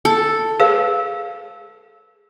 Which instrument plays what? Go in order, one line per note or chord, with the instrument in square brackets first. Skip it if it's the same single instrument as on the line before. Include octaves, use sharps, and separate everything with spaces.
[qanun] A4
[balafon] G#4 [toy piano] B4 F5 E6